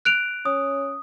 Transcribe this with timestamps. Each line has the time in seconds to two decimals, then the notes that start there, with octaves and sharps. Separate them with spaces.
0.05 F#6 D7 F7
0.45 C#4 D#6